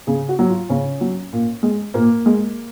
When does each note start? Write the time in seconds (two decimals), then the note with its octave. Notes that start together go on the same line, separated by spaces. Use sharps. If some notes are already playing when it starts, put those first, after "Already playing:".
0.07 C#3 G#4
0.29 F#4
0.39 F#3
0.49 F4
0.69 C#3 C#4
1.01 F#3
1.33 A#2
1.63 G#3
1.94 A#2 A#3
2.26 G#3